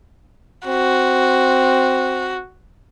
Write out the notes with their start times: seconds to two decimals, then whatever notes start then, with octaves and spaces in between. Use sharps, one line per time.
0.67 C4 F#4